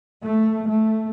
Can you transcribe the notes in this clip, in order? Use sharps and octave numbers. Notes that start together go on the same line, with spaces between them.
A3
A3